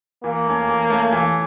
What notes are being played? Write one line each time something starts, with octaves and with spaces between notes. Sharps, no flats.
E3 A#3
A3 C#4
E3
A3 C#4
E3